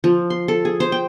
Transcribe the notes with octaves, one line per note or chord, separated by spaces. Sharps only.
F3
C6
A4
G#4
C5
G5